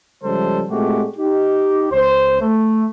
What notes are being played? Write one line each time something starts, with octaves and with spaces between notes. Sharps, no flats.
C#3 F3 G3 G#3 A4 C5
A#2 G#3 A3 C4 F#4 G4
D#4 G4
C#2 C5
A3